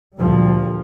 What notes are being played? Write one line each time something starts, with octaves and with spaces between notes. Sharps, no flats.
D2 A#2 F3 G3